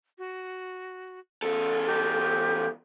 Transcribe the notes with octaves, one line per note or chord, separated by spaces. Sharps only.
F#4
E2 A4
G4